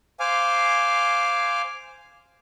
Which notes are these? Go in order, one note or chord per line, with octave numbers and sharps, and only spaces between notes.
C5 F5 G#5 D6